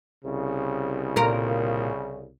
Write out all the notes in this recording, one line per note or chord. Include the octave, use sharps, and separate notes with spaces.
C2 C#3
A#2 A#4